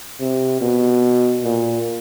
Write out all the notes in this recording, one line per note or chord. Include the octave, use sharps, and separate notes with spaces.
C3
B2
A#2